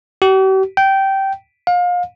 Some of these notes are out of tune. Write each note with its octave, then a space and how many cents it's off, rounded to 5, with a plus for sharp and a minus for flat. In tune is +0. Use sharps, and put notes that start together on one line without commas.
G4 -45
G5 -15
F5 +30